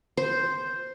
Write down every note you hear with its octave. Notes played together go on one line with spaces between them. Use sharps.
C5